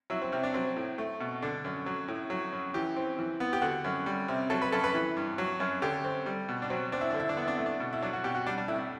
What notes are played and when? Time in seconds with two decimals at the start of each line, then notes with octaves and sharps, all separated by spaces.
0.10 F#3 E4
0.22 C4
0.32 C3 C4
0.43 D4
0.54 F#3 C4
0.76 A2
0.98 A3
1.20 B2
1.42 D3 D4
1.64 F#2
1.86 F#3
2.08 A2
2.30 F#3
2.52 F#2
2.74 E3 G4
2.96 C4
3.19 E3
3.40 B3
3.53 G4
3.62 D3 F#4
3.84 F#2
4.06 G3
4.28 C3
4.50 F#3 A4
4.62 B4
4.72 F#2 A4
4.84 B4
4.94 E3
5.17 G2
5.38 F#3
5.60 F#2
5.82 D3 G4
6.04 C4
6.26 G3
6.49 B2
6.62 D4
6.70 F#3 C4
6.92 C4 D4
7.01 E4
7.11 D3 D4
7.20 E4
7.29 D4
7.37 B3 E4
7.48 D4
7.57 A3 E4
7.66 D4
7.80 B2
7.93 E4
8.02 F#3 D4
8.13 F#4
8.24 B2 G4
8.35 F#4
8.47 G3 D4
8.58 D4
8.68 A2 E4
8.79 E4